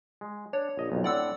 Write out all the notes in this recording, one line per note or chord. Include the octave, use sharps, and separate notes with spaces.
G#3
D4 C#5
A#1 D#5
B1 F2
A2 C4 D4 D5 F#5 E6